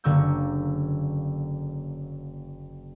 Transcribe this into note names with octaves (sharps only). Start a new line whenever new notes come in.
F#1 D3 A#3 C#6 E6 G6